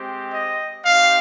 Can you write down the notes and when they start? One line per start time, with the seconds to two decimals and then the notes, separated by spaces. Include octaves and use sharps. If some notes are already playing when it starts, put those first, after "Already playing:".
Already playing: G#3 C4 G4
0.33 D#5
0.85 C4 D#4 G4 F5